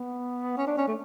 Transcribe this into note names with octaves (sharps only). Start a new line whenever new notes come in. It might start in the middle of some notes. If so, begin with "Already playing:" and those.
Already playing: B3
C#4
D4
C#4
A3